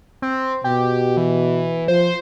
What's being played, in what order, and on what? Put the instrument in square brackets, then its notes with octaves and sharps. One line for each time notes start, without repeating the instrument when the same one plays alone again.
[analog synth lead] C4
[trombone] B2 [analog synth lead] G4
[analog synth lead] E3
[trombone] F3 [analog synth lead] C5